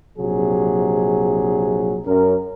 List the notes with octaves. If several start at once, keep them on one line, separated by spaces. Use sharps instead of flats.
A#1 C3 F#3 G#4
F#2 C#4 A#4